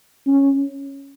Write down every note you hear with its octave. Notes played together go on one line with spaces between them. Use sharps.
C#4